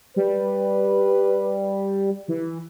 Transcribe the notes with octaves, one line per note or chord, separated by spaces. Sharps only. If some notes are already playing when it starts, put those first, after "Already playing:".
G3 B4
E3